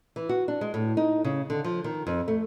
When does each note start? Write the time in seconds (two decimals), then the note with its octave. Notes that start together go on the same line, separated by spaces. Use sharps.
0.16 E3
0.29 F#4
0.48 D4
0.61 G#3
0.74 A2
0.97 D#4
1.24 C#3
1.50 D3
1.64 F3
1.84 D#3
2.07 F2
2.28 A3